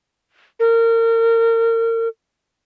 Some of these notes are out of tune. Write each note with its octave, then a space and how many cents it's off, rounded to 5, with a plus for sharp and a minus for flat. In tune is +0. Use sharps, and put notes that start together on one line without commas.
A#4 -30